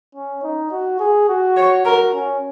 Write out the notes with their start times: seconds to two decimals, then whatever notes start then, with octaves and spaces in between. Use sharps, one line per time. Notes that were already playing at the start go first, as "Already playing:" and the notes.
0.15 C#4
0.44 D#4
0.72 F#4
1.00 G#4
1.29 F#4
1.57 C#5
1.85 F#4 A#4
2.14 C#4